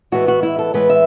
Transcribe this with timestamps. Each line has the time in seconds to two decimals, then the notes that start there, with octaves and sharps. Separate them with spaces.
0.12 A2 E3 G#3 B3 F#4
0.28 F#4
0.43 E4
0.59 A4
0.74 A2 E3 G#3 B3 B4
0.90 E5